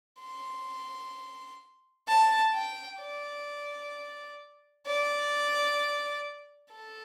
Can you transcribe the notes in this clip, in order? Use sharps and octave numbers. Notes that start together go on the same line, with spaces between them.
C6
A5
G5
D5
D5
A4